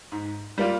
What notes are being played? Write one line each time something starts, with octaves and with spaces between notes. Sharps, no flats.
G#2
G3 A#3 F4